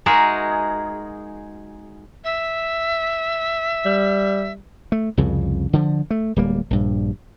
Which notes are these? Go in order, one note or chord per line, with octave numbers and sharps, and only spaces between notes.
G#3 D#4 F#4 G#4 A#4 E5
E5
G3
A3
C2 F2 C#3
D3 F3
A3
D1 G3 A#3
A#1 G2